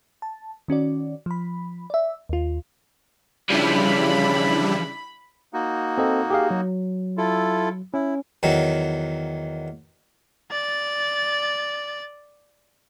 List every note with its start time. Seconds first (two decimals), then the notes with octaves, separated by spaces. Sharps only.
0.22 A5
0.68 D#3 C#4 F#4 D5
1.26 F3 B5
1.90 D5 E5
2.29 D#2 F4
3.50 C#3 E3 F3 G3 D4 E4 B5
5.53 A#3 D#4 F#4
5.98 C4 A4 D#5
6.30 G4 G#4 F5
6.51 F#3
7.17 E4 F4 A4
7.94 C#4 E4
8.43 E2 D#3 F#3
10.51 D5 A6